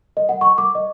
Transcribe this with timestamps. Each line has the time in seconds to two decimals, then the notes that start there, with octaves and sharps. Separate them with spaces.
0.17 D#5
0.29 F#5
0.41 C#6
0.58 D6
0.75 D#5